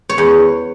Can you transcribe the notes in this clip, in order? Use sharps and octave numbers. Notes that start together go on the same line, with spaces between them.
C#5
E2